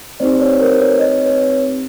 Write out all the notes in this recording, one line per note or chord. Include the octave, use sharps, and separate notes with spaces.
A3 C4 D#4 G4 C5 D5
B4 C#5
A#4 C5
B4 C#5
C#5 D#5
B4 C#5